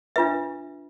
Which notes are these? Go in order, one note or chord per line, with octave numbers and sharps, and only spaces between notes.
D4 F4 B4 E5